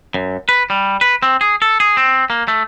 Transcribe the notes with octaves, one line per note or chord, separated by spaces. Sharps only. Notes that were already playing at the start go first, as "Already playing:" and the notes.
F#2
B4
G3
B4
C4
G#4
A4
G#4
C4
A#3
A3